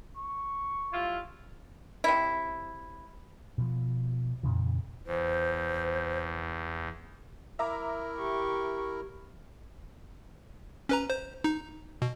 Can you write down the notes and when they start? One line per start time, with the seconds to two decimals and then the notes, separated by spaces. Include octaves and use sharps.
0.17 C#6
0.93 G3 E4 F4
2.04 C3 E4
3.58 B2 F3
4.43 F2 A#2 C#3 E3
5.07 E2 C5
7.59 E4 A#4 E5 A#5 D6
8.17 G4 C#6
10.89 C#4 B4 A#5
11.10 C5
11.44 D#4
12.02 B2